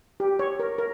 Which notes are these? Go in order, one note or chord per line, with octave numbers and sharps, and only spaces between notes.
G4
C#5
A#4
A#4